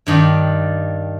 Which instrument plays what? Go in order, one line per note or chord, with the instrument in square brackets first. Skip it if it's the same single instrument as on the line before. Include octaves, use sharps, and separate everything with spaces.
[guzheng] G2 D#3 D4 D5